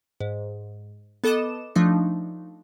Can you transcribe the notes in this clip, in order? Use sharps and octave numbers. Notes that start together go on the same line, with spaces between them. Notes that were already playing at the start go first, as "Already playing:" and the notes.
G#2
B3 A4 D#5 D6 E7
F3 A3 D4 D#4